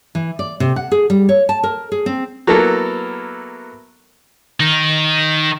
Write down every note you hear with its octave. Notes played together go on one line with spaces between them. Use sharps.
E3
D5
C3
F#5
G#4
G3
C#5
A5
A#4
G#4
C4
F#3 A#3 B3 E4 A4 A#4
D#3 D#4